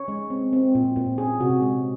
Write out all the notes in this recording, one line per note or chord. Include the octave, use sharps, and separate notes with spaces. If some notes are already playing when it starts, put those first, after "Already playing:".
Already playing: C#4 C#5
G#3
C4
C4
A#2
A#2
C#4 G#4
C3 F#4
G#3